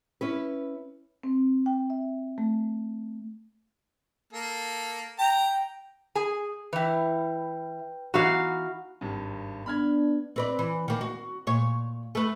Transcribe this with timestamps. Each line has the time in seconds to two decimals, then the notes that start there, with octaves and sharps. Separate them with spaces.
0.21 C#4 E4 B4
1.23 C4
1.66 G5
1.90 E5
2.38 A3
4.33 A#3 A4
5.19 G5 A#5
6.15 G#4 G#5
6.73 E3 E4 B4 G5
8.14 E3 B3 D#4 F#4 F5
9.01 G#1 G2
9.66 B3 D4 B5 F6 G#6
10.36 C4 B4 D5
10.59 E3
10.88 D#3 A#3
11.01 F#4
11.47 A#2 C#5
12.15 A3 B4